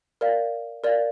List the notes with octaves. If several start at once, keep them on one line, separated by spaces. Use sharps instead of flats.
A#4 D5 F5
A#4 D5 F5